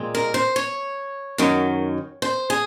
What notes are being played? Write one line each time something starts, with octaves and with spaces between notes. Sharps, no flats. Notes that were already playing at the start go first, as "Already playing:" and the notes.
Already playing: A#2 G#3 C4
A#4
C5
C#5
F#2 D#3 F#3
C5
G#4